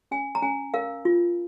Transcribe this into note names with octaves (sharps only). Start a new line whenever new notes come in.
C#4 G#5
A#5
C#4 G#5
A#4 F5
F4